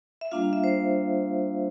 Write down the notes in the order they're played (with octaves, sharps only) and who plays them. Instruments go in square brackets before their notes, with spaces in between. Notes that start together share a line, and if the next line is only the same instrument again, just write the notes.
[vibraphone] E5
G3 A#3 D4 F4 F5
F5
E5
C5